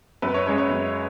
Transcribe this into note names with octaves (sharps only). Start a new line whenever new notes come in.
F#2 B4
C#5
C#3 G#3 C#5
C#5
F#2